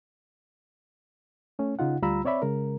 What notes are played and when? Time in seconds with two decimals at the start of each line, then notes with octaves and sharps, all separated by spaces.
1.59 A3 C#4
1.79 C#3 D#4 F4 F#5
2.02 D2 G3 F4 A#5 B5 E6
2.25 C4 C#5 D5 E5 B5
2.42 C#3 G#3 A#4